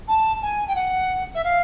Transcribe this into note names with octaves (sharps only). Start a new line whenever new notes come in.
A5
G#5
G5
F#5
E5
F5